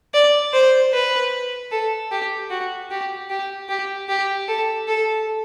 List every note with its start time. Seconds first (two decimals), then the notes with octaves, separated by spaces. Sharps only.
0.14 D5
0.53 C5
0.94 B4
1.72 A4
2.11 G4
2.50 F#4
2.91 G4
3.30 G4
3.69 G4
4.09 G4
4.48 A4
4.88 A4